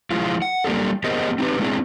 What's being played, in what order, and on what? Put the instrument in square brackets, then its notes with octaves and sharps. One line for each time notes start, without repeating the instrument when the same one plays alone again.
[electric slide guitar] F3 G#3 E4 F4
F#5
G3 A#3 D4 G4 A4
B3 G4 G#4 A#4 C5 D#5
C4 D#4 G4 B4
G#3 B3 C4 D4 E4 G#4